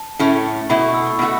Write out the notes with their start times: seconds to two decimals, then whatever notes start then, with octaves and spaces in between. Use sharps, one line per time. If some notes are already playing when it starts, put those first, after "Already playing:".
Already playing: A5
0.19 A2 A3 C#4
0.70 B2 A3 E4 B5
0.82 C#6
0.94 E6
1.07 C#6
1.19 B2 A3 F#4 E6